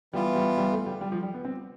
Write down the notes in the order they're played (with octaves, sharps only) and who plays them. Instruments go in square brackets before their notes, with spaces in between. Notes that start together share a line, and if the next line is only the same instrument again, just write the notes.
[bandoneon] E3 B3 F4 [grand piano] G3
[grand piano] G3
G3
A3
G3
G3
F3
G3
B3
C4